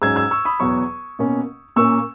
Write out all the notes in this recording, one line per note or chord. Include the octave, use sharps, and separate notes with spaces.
G#2 F#3 C#4 E6 G#6
E6 G#6
C#6 E6
B5 D#6
E2 B2 F#3 B3 C#6 E6
B2 A#3 C#4
A#2 A#3 C#4 C#6 E6